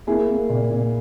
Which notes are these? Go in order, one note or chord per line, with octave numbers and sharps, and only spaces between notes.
A#3 E4 G#4
A#3
A#2
A#2